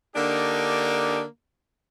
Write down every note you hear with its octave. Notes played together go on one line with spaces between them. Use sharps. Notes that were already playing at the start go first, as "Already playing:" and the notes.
D3 A#3 D4 D#4 G4